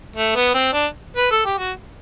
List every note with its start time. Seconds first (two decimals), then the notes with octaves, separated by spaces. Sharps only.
0.16 A3
0.36 B3
0.54 C4
0.73 D4
1.17 B4
1.31 A4
1.46 G4
1.59 F#4